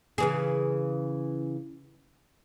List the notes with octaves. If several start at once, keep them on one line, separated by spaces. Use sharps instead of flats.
C#3 E3 G#4